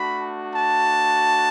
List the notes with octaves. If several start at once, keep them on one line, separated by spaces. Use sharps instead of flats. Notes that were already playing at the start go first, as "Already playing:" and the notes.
Already playing: A3 D4 F#4 B5
A5